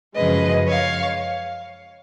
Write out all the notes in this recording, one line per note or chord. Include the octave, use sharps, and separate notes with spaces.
F#2 C#3 F3 G#3 B4 D#5
C#5 F5